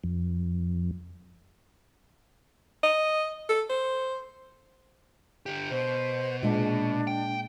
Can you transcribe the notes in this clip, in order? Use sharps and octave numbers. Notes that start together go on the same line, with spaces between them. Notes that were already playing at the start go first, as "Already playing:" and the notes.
F2
D#5
A4
C5
D3 G4
B2 C5
A#2 G#3 D4
G5